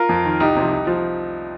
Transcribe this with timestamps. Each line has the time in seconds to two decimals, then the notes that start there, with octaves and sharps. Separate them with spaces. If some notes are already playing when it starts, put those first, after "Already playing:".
Already playing: F4 A#4
0.09 F2
0.25 D#3
0.40 C2 D#4 G4
0.56 C3 F3
0.72 C2
0.87 F3